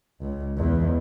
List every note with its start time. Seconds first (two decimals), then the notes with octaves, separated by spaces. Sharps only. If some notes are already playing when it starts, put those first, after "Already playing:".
0.21 C#2
0.57 E2